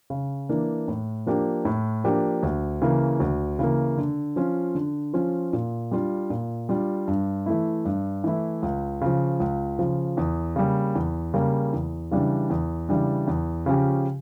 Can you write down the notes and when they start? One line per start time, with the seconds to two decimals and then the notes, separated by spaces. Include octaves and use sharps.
0.10 C#3
0.49 E3 A#3 D4
0.88 A2
1.27 F3 A#3 D4 G4
1.65 A2
2.04 F3 A#3 D4 G4
2.43 D2
2.82 C#3 E3 A#3
3.20 D2
3.59 C#3 E3 A#3
3.98 D3
4.36 F3 C#4 F4
4.75 D3
5.14 F3 C#4 F4
5.53 A#2
5.91 G3 D4 F4
6.30 A#2
6.69 G3 D4 F4
7.08 G2
7.46 E3 A3 E4
7.85 G2
8.24 E3 A3 E4
8.62 C#2
9.01 C#3 F3
9.40 C#2
9.79 C#3 F3
10.17 E2
10.56 C#3 G3 A#3
10.95 E2
11.34 C#3 G3 A#3
11.73 E2
12.11 C#3 E3 G3 D4
12.50 E2
12.89 C#3 E3 G3 D4
13.27 E2
13.66 C#3 F3 C#4 G4